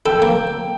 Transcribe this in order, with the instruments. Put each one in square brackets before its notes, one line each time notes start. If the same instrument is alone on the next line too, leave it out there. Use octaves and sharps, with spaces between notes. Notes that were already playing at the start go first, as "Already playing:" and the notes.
[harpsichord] A4 [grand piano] G5
[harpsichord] A#3